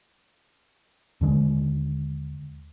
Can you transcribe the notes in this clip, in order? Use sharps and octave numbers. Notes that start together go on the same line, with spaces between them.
D#2 D3 G#3